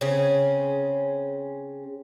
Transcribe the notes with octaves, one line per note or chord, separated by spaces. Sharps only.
C#3 C4 C#4 G#4